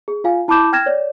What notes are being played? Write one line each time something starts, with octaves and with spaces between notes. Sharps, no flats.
G#4
F4 F5 G#5
E4 A5 B5 D6 G6 E7
G5 F6 G#6 A#6 E7
C#5 D5